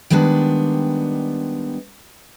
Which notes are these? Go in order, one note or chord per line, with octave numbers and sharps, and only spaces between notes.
D#3 G3 G#3 B3 D4